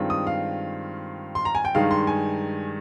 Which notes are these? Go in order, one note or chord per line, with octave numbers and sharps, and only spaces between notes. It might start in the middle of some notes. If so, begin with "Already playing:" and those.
Already playing: G2 D#3 G#3 C4 F4
D#6
F5
C6
A#5
G#5
G5
G2 D#3 G#3 D#4 F5
C6
G#5